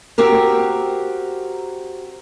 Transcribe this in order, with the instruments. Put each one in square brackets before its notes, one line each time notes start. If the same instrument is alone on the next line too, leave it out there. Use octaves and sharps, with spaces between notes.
[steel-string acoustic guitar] C4 F#4 G4 A#4